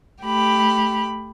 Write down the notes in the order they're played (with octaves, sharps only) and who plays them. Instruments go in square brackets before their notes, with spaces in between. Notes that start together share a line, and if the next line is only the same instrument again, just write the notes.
[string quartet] A3 G4 B5